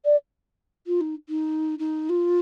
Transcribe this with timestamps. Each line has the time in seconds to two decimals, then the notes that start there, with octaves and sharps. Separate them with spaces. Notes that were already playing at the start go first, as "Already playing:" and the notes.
0.05 D5
0.87 F4
1.01 D#4
1.29 D#4
1.79 D#4
2.09 F4